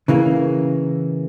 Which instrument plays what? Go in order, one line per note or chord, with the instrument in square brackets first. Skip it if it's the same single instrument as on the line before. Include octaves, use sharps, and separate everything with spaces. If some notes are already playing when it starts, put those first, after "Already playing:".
[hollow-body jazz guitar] C#3 E3 A#3